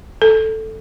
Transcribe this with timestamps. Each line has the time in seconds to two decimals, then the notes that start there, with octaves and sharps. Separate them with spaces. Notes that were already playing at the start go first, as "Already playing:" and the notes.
0.22 A4